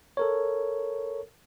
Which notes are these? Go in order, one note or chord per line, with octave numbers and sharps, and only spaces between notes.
A4 A#4 C#5